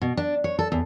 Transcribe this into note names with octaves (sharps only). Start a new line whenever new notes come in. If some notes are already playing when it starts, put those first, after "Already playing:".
B2
D4
C#5
A4
E2